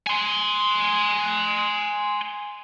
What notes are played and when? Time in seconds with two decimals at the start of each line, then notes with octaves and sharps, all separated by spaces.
0.07 G#5 C6